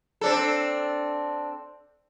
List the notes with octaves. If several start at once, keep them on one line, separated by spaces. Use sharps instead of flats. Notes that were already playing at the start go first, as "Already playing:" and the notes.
C4 D4 A4